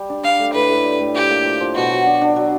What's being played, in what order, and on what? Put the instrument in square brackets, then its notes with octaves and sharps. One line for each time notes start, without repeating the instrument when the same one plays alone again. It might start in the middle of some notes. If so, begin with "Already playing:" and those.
Already playing: [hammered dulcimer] G3
D4
[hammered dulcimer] D4 [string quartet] F5
[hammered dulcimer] A3
[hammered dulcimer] A2 [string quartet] B4
[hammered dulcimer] A2
G3
A2
[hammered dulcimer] F3 [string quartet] G4
[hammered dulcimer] A#3
F3
F3
[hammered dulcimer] B2 [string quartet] F#4
[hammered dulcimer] F#3
D4
D4
F#3